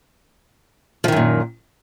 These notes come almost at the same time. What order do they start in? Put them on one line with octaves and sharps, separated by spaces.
F3 D#3 F#2 A#2